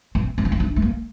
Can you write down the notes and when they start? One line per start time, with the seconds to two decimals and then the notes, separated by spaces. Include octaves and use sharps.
0.15 C4
0.38 C4
0.45 D4
0.52 C4
0.60 D4
0.76 A3
0.82 A#3